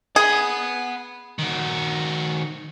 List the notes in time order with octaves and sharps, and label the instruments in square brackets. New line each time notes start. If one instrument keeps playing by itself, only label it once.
[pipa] G#4 [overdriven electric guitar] F#5 B5
[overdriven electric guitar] D#3 F#4